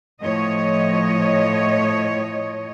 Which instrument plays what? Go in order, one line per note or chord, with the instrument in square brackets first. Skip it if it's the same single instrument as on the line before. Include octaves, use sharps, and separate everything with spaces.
[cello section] A2 F3 C#5 D#5